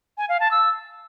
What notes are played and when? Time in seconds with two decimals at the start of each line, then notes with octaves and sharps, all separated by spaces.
0.18 G#5
0.29 F5
0.40 A5
0.51 E6